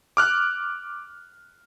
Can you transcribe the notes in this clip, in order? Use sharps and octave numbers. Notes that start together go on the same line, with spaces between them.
D6 F6 F#6